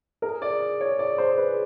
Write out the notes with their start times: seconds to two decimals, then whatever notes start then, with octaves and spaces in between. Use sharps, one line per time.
0.22 G#4 A#4
0.42 D5
0.81 C#5
0.99 D5
1.18 C5
1.38 B4